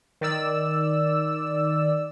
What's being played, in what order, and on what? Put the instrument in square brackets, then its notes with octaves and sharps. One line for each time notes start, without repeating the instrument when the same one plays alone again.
[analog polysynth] D#3 D5 E6